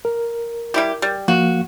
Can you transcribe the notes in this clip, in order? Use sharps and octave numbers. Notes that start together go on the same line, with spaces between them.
A#4
G3 E4 G4
G3
F3 A#3 F#4 F5